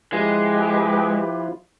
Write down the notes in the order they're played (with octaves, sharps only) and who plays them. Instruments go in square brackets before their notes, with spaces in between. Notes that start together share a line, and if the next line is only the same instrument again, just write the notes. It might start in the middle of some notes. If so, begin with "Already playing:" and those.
[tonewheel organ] F3 E4 F4 [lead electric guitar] G#3 [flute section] G4 B4